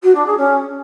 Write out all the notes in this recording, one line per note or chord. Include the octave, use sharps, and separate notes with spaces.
F#4
D4
G#4
C#4